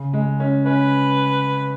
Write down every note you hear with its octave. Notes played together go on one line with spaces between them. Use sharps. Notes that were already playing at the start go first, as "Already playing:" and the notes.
Already playing: C#3
G#3
C#4
C#4 B4